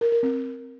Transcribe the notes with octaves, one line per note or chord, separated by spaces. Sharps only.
A#4
A#4
C4